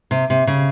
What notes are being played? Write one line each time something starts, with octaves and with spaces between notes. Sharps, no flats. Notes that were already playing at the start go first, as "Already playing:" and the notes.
C3
C3
C#3